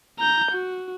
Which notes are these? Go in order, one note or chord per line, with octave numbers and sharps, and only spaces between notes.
A#5 G6
F#4